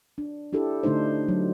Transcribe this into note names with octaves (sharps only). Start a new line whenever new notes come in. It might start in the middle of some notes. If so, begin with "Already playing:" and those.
D4
D4 E4 G4 A4
D3 A3 D4 D#4 C5
F#3